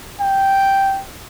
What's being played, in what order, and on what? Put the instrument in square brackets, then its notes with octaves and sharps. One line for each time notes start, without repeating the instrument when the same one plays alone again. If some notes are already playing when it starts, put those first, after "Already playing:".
[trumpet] G5